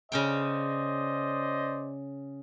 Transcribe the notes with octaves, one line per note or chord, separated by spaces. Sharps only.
C#3 C#4 C5 D5 D#5 G5